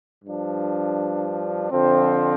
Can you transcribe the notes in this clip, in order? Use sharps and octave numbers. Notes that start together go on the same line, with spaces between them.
G2 F3 D4
F2 D3 F3 C4